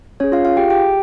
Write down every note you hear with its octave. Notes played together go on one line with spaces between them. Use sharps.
C#4 G#4 C#5
F4 F5
F4 F5
G4 G5
G4 G5